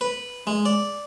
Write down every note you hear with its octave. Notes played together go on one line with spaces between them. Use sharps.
B4
G#3
D5